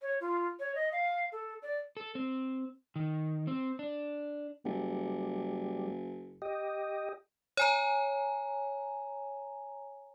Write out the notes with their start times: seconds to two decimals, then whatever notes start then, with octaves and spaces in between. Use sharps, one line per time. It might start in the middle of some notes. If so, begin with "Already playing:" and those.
0.02 C#5
0.21 F4
0.60 C#5
0.75 D#5
0.92 F5
1.32 A4
1.62 D5
1.97 A4
2.15 C4
2.96 D#3
3.47 C4
3.79 D4
4.65 F#1 G3
6.42 G4 D#5
7.57 C#5 G#5 A#5